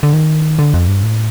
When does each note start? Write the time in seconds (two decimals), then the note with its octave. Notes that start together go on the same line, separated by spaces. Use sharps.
0.03 D3
0.13 D#3
0.59 D3
0.74 F2
0.88 G2
1.03 A2